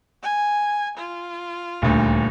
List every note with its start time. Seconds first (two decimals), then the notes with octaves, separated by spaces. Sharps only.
0.23 G#5
0.98 F4
1.82 D#1 D2